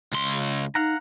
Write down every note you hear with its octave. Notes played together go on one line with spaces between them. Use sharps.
C#2 C6
D#4 F5 F#5 A#5